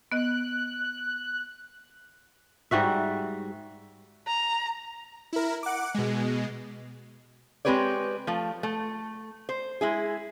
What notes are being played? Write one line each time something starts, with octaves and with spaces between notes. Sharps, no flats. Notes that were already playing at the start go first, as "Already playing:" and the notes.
B3 D#5 F#6
G#2 G3 F#4 E5
A#5
E4 A#4
F#5 D6
B2 G#3
G#3 C4 G4 B4 C#5 D5
F3 A3
A3
C5
G#3 E4 G#4